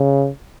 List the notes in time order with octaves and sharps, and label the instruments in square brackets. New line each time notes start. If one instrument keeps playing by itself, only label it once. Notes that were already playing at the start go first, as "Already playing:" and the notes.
Already playing: [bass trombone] C#3